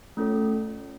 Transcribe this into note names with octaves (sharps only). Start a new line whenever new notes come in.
A3 C#4 F4 A4 C#5